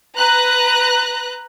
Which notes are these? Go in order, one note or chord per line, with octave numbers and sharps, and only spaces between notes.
B4 A#5 F#6